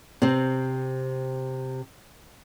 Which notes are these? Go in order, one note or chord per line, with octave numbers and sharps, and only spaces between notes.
C3 C4